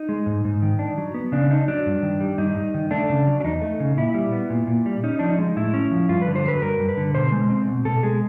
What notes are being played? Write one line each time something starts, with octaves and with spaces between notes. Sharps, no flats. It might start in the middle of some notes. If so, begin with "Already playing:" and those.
Already playing: D#4
G#3
G#2
G#2
D#3
D4
F#3
B3
C#3 D4
D4 D#4
F#3 D4
G2
D#3
G3
G2 D#4
G2
D#3
A3 D4
C#3
F#3
D4
E2 D#4
A3
C#3
A#2 E4
G3
B3
A#2
A#2
G3
C#4 D#4
F3 D4
D#4
G#3
A2 E4
C#4
F3
G2 F4
D3 B4
C5
F#3 B4
G2 A#4
G2
B4
D3
B2 C5
G#3
C4
B2
B2 A4
G#3 G#4